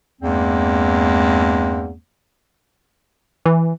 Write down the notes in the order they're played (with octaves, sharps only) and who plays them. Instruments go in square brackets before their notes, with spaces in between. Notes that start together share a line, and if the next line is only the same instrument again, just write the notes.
[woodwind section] E2 G2 G#3 A#3 C4
[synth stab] E3